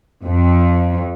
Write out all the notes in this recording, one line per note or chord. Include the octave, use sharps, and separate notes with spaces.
F2